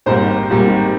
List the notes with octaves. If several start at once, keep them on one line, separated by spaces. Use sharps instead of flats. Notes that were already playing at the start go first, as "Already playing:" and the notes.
G#1 G#2 G3 A#3 C5
G#1 G#2 G3 A#3